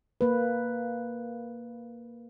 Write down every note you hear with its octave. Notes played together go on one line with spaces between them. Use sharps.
A#3 B4